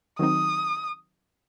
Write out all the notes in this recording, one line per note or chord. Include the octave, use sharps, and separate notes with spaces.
D#3 F#3 C4 D#4 D#6